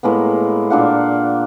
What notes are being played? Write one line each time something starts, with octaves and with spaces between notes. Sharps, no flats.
A2 G#3 A#3 B3
A#2 D4 F5 F#5